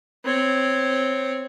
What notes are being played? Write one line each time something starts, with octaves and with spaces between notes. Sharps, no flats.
C4 C#5